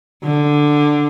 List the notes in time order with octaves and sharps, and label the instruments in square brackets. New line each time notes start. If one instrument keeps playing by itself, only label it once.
[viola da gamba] D3